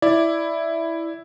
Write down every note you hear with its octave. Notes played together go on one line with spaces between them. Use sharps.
E4 D5